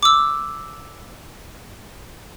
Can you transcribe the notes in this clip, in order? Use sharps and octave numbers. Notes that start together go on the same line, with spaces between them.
D6 E6